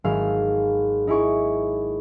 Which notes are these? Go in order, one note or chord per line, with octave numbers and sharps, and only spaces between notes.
G#1 F#3 G#4 F5 E6
D#4 E4 G#4 C#6 D6